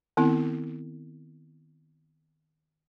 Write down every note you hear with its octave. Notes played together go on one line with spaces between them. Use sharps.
D#3 B3 C4 E4